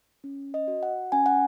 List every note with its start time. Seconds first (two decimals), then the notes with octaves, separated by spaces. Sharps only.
0.24 C#4
0.54 D#5
0.68 F#4
0.83 F#5
1.12 C#4 G#5
1.26 F#5